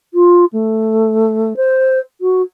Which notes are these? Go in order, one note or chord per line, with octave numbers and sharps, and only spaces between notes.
F4
A3
C5
F#4